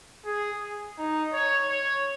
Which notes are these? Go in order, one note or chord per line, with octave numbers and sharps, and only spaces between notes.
G#4
D#4
C#5
C#5